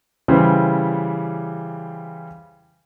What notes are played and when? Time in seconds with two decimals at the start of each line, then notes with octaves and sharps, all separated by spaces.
0.28 C#3 E3 G3 C5